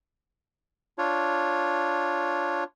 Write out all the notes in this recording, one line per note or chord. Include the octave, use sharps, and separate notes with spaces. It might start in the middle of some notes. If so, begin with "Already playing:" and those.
D4 F4 C#5